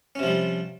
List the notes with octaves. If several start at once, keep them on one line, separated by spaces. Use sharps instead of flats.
C3 F3 G3 C#4